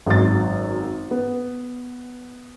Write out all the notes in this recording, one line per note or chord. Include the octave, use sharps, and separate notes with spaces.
G#1 F#2 A6
B3